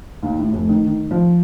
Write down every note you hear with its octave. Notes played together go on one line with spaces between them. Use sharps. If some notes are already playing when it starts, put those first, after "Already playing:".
D#2
A2
F1
D#3
D#3
F3